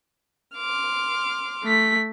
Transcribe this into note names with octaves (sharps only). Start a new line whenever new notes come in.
C6 D6 F6
A3 B6